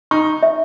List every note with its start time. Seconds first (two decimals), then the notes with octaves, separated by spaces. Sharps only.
0.11 D#4 C#6
0.43 E5